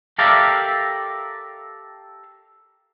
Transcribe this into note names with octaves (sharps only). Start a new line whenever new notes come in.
G4 A4 A#4 D5 E5 F5